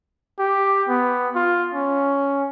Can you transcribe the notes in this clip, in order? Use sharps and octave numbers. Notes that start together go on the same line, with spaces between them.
G4
B3
F4
C#4